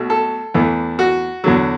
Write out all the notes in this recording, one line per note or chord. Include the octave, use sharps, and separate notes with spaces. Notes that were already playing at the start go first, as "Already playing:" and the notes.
Already playing: B1 B2 A3
A4
E2 E3 A3
F#4
E2 D3 F#3